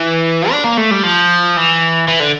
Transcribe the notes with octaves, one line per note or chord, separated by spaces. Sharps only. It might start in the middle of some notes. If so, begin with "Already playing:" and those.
Already playing: E3
D4
A#3
A3
G3
F3
E3
E3
D3